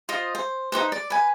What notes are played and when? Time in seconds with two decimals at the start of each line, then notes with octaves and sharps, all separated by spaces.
0.09 F4 C5 D#5
0.35 C5
0.72 D#4 F#4 B4 C5
0.92 D5
1.10 B4 G#5